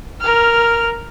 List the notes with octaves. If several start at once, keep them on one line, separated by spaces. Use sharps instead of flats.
A#4 F6